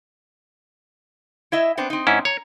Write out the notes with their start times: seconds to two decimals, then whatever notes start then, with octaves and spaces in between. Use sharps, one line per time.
1.52 E4 D#5 E5
1.77 B3 C4 D4
1.90 C4 D#4
2.07 G#2 C#4 E4
2.25 C#5 A#5